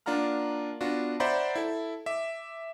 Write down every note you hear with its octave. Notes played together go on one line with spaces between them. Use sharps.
A#3 D4 F4 F#5 A#5 F6
B3 D4 F4 F#4
C5 D5 E5 F#5 A#5 B5
E4 A4
E5 D6